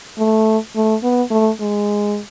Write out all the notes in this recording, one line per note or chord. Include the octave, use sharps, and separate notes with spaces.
A3
A3
B3
A3
G#3